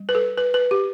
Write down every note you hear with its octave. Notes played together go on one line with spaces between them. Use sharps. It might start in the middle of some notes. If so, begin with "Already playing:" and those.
Already playing: G3
B4
A4
B4
B4
G4